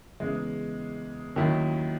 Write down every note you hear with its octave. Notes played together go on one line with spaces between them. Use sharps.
E2 C#3 G#3
D#2 D#3 F#3 C#4 E4